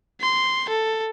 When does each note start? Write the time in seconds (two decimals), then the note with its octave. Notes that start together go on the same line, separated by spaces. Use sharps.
0.21 C6
0.69 A4